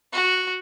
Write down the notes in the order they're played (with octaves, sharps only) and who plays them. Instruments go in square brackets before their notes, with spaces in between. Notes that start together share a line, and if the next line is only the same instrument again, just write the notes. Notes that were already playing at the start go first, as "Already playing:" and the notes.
[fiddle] F#4